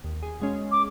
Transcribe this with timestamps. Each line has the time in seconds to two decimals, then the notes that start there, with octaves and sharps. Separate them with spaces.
0.04 D#2
0.23 G#4
0.40 B2 G#3 C#4
0.72 D6